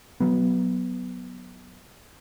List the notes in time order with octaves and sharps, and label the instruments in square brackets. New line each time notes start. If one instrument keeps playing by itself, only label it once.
[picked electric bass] F#3 B3